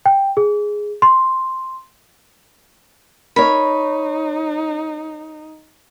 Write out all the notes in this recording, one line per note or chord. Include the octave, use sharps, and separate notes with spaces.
G5
G#4
C6
D#4 A#4 C#5 B5